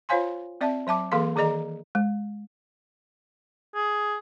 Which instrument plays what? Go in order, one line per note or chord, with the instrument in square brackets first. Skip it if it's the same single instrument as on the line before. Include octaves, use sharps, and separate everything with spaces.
[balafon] F4 C5 C#5 F5 G#5 C6
C4 D5 E5 A5
F#3 E5 A5 D6
E3 A#3 G#4 A4 F5 C6
D#3 G#4 D5 D#5 A#5
G#3
[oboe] G#4